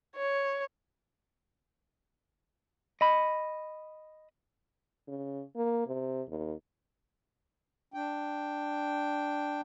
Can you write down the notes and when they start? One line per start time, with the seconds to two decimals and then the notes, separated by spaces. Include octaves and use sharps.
0.17 C#5
3.01 D#5 B5
5.08 C#3
5.56 A#3
5.87 C3
6.28 D#2
7.94 D4 G5